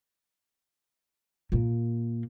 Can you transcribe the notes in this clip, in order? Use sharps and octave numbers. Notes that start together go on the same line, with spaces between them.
A#2 A#3